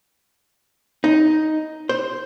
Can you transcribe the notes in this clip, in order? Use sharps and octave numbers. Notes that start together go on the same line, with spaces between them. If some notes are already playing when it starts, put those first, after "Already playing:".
D#4
C5